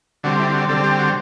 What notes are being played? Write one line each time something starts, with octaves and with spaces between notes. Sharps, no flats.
D3 G3 C4 F#4
E4
F#4
D3 G3 C4 A4
G4
F#4